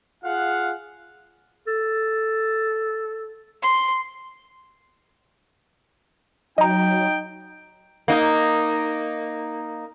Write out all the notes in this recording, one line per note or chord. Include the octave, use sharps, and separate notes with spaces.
F4 G#4 F5 F#5
A4
C6
F#3 D#4 D#5 G5 A#5
A#3 D#4